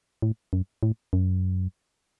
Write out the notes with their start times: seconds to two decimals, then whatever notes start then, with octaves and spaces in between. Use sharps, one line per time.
0.22 A2
0.53 F#2
0.83 A2
1.13 F#2